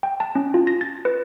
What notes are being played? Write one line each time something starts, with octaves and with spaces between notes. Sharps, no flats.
G5
A5
C#4
F4
A#6
A6
B4